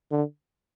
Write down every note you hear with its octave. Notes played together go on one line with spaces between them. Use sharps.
D3